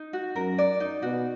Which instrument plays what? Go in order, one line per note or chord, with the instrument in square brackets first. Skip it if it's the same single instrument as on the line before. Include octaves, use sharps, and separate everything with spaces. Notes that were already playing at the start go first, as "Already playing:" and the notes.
Already playing: [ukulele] D#4
F#4
[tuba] F#2 [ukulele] A#4
[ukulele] D5
D#4
[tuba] B2 [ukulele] F#4